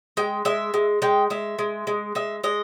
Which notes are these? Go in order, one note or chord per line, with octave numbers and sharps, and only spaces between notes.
G#3 G5
G#3 E5
G#3
G#3 G5
G#3 E5
G#3
G#3
G#3 E5
G#3 D#5